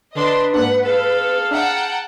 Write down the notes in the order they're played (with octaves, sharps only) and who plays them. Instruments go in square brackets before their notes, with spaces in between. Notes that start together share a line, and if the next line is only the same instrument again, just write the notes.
[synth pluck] D3 [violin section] D4 D#5 C6 [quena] B4
[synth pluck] G#2 A#3 D4 [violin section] F#5
[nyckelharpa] G#4 F5 [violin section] A4
[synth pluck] D4 E5 [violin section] F#5 G5 A5 [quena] A#5